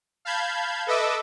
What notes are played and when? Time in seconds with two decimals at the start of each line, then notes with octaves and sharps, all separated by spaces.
0.25 F5 A5 B5 G6 G#6
0.87 A4 B4 D#5 E5 D6 E6